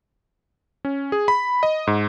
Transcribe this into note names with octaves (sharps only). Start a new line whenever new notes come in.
C#4
G#4
B5
D#5
G#2